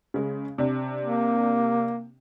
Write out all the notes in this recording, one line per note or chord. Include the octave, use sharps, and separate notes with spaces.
C#3 G#3
C3 D4
A#3